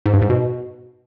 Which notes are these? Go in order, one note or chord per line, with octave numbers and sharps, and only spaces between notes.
G#2
G2
G#2
B2